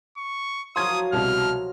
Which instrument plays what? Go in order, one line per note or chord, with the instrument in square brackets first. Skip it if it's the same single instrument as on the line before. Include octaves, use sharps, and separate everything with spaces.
[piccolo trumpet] C#6
[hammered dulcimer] F3 F#3 A#4 [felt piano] C6 G#6 [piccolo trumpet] D#6
[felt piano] C2 B2 [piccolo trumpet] F6